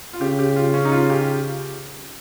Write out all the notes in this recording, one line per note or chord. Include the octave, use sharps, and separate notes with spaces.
F4
C#3 G4
G4
F4
C#4
D#4
F4
G4